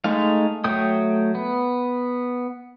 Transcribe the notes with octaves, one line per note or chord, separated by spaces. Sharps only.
G#3 A3 D#4 F5
F#3 A3 G5 D#6
B3